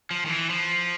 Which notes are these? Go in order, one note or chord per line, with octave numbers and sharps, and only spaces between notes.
F3
D#3
E3
F3